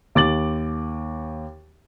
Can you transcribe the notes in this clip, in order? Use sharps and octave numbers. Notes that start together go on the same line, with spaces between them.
D#2 D6 A6 F#7